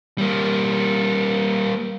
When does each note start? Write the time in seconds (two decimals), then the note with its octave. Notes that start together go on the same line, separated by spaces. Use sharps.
0.18 G3 A#3